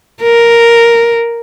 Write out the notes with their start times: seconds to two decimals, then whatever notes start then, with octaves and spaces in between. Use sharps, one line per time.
0.22 A#4